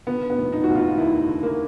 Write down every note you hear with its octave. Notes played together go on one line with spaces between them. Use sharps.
D3 B3
B3
F1
D#4
F1 F#4
F4
D#2 E4
D3
A#3